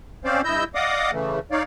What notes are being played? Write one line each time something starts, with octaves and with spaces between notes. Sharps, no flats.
C4 C#4 C5 D5 F5
G2 E4 D#5 E6 G6
D5 D#5 F5 F#5 D6 D#6
C#3 E3 A3
D#4 C#5 D5 F5